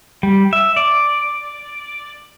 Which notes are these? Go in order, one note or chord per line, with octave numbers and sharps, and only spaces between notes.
G3
E5
D5